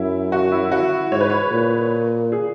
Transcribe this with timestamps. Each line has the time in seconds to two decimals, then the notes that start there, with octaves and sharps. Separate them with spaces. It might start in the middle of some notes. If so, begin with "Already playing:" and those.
Already playing: F#2 E4
0.32 F#4
0.52 E4
0.72 F#4
1.11 G#2 C#5
1.21 B4
1.30 C#5
1.51 A#2
2.32 G#4